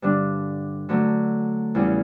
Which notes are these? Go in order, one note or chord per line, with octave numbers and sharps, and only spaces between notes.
G2 D3 G3 D4
D3 F#3 A3
E2 C#3 G3